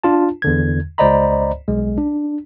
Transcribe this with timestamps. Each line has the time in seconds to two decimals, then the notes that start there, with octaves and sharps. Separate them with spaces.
0.04 D4 F4 A5
0.42 E2 D3 G#6
0.98 C#2 C5 D5 D#5 A#5 B5
1.68 B1 G#3
1.98 D4